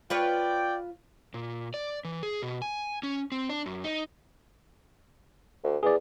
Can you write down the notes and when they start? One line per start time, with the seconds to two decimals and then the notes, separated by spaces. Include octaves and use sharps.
0.10 F4 B4 C#5 D5 G5
1.34 A#2
1.74 D5
2.04 E3
2.23 G#4
2.42 B2
2.62 G#5
3.03 C#4
3.32 C4
3.49 D4
3.66 F#2
3.84 D#4
5.63 D2
5.83 E2 G#4 D5